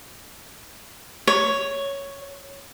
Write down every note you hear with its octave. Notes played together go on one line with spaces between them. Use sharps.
C#5